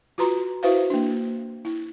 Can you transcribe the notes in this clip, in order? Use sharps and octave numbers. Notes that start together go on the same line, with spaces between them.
F4 F#4 B4 A#5 C6
E4 F#4 B4 C5 E5 F5
A#3 D4
E4